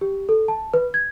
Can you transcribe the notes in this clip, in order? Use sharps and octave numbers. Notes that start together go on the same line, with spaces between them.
G4
A4
A5
B4
G#6